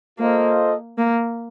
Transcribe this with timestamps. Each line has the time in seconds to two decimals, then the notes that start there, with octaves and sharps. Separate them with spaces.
0.18 A#3 F4 A4 C5 D#5
0.98 A#3